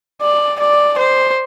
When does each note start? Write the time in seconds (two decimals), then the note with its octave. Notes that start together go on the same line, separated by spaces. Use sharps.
0.22 D5
0.60 D5
0.99 C5